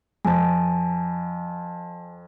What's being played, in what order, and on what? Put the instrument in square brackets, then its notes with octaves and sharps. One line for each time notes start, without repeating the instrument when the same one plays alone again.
[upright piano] F2 [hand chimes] G#5 A5